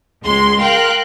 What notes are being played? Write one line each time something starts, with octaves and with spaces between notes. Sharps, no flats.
C#2 G#3 C6
A#4 F5 G5 F#6